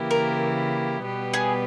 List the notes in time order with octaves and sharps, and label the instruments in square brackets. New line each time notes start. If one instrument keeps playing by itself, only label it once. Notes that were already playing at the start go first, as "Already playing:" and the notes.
Already playing: [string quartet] C#3 E3 A#3 E4 G4
[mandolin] A#4
[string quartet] B2 G3 B3 G4 B4
[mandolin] G#4